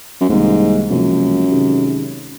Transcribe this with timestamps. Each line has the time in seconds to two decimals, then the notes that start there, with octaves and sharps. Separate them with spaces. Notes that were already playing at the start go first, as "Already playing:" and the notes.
0.21 F#2
0.29 C2 G#2 C3 D#3 A#3
0.90 C#2 F#2 C3 F3 A#3
1.51 C3 D#3 G#3 C#4